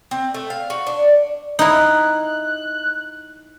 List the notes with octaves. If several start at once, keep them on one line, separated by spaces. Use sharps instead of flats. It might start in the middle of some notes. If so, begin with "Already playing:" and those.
C4
A3
F5
F#4
D4
D#4 E4 F#6